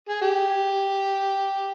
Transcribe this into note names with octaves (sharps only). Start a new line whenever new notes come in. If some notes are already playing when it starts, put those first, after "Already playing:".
G#4
G4